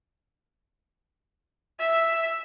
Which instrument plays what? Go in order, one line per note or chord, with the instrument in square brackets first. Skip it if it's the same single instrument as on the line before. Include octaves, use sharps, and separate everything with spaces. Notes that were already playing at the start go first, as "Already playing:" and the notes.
[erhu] E5